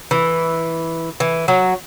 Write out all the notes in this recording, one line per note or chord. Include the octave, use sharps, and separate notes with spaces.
E3
E3
F#3